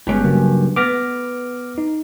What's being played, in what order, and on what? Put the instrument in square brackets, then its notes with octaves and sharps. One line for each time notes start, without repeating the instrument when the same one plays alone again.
[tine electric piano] G1 G#3 B3 [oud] G2 C#4
[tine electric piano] C#3 F#3 A#3
[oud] B3 [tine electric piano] D6 F6 A#6
[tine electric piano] D#4